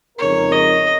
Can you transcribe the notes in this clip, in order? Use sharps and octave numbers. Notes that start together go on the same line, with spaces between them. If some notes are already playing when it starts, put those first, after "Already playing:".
F2 C#3 G#3 D#4 A#4 C#5
D#5